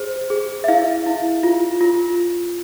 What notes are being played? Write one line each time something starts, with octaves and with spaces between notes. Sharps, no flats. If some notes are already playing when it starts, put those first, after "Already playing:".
Already playing: G#4 C5
G#4
E5
E4 F5
E4
F4
F4